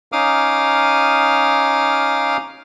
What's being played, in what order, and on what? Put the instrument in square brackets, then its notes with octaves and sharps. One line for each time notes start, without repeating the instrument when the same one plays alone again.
[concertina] C#4 D#4 F5 D6 D#6 F6